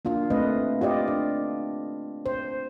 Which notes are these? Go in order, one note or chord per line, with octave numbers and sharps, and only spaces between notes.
A#3 D4 F4
A3 C4 B4 D#5
F4 G4 D5 D#5
D4
C5